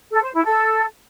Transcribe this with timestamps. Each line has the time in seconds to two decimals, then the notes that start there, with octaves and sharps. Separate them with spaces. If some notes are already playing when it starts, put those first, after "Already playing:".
0.12 A4
0.23 C5
0.34 E4
0.45 A4